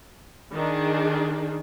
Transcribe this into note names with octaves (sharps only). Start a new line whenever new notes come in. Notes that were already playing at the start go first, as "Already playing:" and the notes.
D#3 D4 G#4